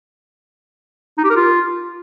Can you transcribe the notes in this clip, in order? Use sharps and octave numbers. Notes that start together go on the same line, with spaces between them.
D#4
G4
A#4
F4